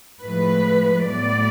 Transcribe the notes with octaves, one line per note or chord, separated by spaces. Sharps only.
A2 F3 G#3 B4
A2 F#3 B3 D5